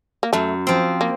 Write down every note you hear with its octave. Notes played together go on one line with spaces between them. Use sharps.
A#3
F#2 A3
F3 C4
A#3